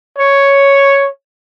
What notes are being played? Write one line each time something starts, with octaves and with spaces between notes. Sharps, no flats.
C#5